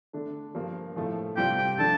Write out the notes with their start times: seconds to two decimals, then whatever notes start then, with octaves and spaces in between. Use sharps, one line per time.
0.13 D3 A3 D4
0.55 G2 F3 A#3
0.96 A2 F3 A3
1.37 C3 G3 C4 F4 G5
1.58 G5
1.78 D3 F3 A3 D4 A5